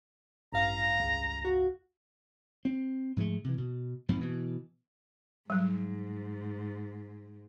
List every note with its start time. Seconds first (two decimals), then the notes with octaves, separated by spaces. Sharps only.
0.52 A1 G2 F5 A#5
1.00 C#2
1.45 F#4
2.65 C4
3.16 G#2 F3 G#3 A3
3.44 C3 E3
3.58 B2
4.09 F2 G#2 F3 C4
4.21 B2 E3
5.50 G#2 F#3 G3